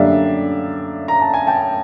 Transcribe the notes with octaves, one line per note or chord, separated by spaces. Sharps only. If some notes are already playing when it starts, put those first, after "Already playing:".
Already playing: F#2 D3 G3 A#3 D4 D5 E5 F5
A#5
A5
G#5
G5 A5